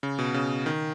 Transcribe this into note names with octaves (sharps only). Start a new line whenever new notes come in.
C#3
B2
C#3
D#3